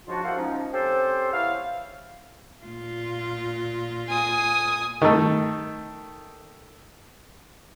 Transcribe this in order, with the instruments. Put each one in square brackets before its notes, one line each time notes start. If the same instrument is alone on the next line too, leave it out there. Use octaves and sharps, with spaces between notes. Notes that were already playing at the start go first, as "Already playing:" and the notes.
[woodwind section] G#2 C#3 F3 D4 F4 F#4
A#3 E4 A4 C5 F5 F#5
F3 G#3 C#4 D#4
C4 C#4 G4 A4 C5
B3 E4 C5 C#5 F5
[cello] A#2 F4
[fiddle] G#5 D#6
[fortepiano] D#3 A3